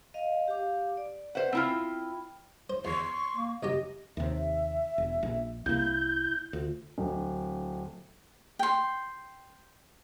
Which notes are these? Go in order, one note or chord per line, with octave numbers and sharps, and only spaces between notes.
D#5 F5
G4 F5 D6
D5
B4 C5 E5 F#5
C4 E4 F4 G5 B5
C5
E2 C6 C#6
A#3
C2 F#2 G4 D#5
D#2 C3 E5
E1
A#1
C2 A#3 E4 G6
D2 F4
D1
G5 C6